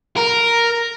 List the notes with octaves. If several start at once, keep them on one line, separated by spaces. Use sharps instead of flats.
A#4